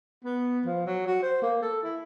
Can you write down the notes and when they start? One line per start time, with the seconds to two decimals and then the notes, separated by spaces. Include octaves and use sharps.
0.25 B3
0.66 F3
0.86 F#3
1.07 F#4
1.22 C5
1.42 A#3
1.62 A4
1.83 E4